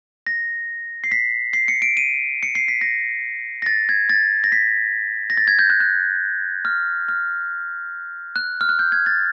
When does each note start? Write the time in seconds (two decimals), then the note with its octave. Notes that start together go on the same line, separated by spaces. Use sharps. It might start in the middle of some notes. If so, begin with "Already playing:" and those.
0.27 A#6
1.04 C7
1.12 B6
1.53 C7
1.68 C#7
1.82 D7
1.97 D#7
2.43 C#7
2.55 C7
2.68 B6
2.81 A#6
3.62 A#6
3.66 A6
3.89 G#6
4.09 A6
4.44 A#6
4.52 B6
5.30 A#6
5.37 A6
5.48 G#6
5.59 G6
5.70 F#6
5.80 F#6
6.65 F6
7.09 F6
8.36 F#6
8.61 F6
8.69 F#6
8.79 G6
8.92 G#6
9.06 A6